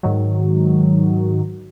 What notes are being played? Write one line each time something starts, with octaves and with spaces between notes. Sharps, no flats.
G#2 D#3 F#3